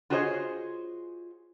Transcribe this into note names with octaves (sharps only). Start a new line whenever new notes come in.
F4 F#4 G#4 C5 C#5 D#5